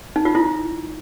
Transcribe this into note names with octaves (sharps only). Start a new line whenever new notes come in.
D#4
F4
E4